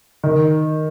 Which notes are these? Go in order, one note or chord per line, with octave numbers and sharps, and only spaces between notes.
D#3